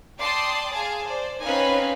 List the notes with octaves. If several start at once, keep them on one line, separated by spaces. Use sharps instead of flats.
D5 G5 A5 C6 D6 D#6
G#4 F5 G#5 A5
C5 D5
C4 C#4 D#4 B4 F5 G#5